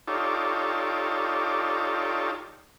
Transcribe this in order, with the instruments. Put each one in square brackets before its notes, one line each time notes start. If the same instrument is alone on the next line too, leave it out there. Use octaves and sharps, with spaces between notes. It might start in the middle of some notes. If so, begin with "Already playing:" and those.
[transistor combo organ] D#4 F4 G4 A4 C#5 D5